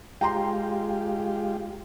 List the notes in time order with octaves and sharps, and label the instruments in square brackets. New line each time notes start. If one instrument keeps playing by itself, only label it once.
[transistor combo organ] G#3 F4 G4 [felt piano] G5 A#5 C6